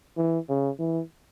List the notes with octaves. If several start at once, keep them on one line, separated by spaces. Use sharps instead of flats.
E3
C#3
E3